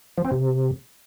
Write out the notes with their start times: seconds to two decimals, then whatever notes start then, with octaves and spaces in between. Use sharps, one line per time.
0.18 F3
0.25 C4
0.32 C3